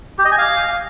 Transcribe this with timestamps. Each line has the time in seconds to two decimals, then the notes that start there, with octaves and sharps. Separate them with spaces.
0.18 G4
0.25 D#5
0.32 G#5
0.38 F5